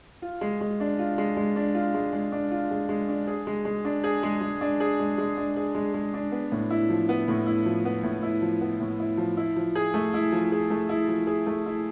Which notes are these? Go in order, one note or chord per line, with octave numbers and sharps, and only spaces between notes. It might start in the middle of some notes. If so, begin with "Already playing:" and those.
F4
G#3
G#3
D4
F4
G#3
G#3
D4
F4
G#3
G#3
D4
F4
G#3
G#3
D4
G#4
G#3
G#3
D4
G#4
G#3
G#3
D4
G#4
G#3
G#3
D4
G#4
G#3
G#3
D4
B3
A2
E4
F3
B3
A2
E4
F3
B3
A2
E4
F3
B3
A2
E4
F3
E4
F3
G#4
A3
E4
F3
G#4
A3
E4
F3
G#4
A3
E4